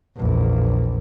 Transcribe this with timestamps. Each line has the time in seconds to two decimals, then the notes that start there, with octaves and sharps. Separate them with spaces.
0.17 A#1 E2